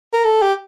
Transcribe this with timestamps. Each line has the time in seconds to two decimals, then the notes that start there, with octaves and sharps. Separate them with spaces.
0.13 A#4
0.24 A4
0.42 G4